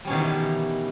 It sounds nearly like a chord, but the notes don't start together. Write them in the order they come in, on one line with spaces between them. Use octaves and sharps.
G3 C#4 B2 D#3 E3